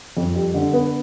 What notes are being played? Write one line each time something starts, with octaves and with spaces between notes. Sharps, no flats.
F2
G3
D3
B3